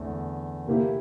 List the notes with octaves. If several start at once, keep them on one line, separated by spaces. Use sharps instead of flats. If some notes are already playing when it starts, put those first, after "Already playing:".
Already playing: E2 D3 A3 C4
C3 E3 A3 A#3 E4 G4